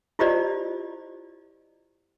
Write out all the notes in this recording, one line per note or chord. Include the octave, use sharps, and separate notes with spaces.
E4 F4 G4 C5 D5 D#5